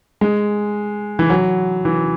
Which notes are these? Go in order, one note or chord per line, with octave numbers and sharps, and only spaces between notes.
G#3
E3
F#3
E3